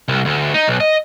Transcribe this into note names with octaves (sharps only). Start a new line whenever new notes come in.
C2
D2
D#4
B1
D#5